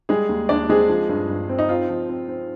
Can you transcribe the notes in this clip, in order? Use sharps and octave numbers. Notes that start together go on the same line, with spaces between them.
G3 G#3 G#4
D#2
D#2 D4 D5
G#3 C4 G#4
F3
G2
G2
C4
D#4
C4 F4
F3
C4
C4